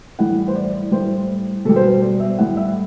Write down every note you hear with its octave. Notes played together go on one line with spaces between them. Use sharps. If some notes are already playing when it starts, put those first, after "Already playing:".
A2 E3 G3 F#5
C5
D5
A2 G3 C5
B2 G3 A4
C5
B4
D5
E5
A2 G3 F#5
E5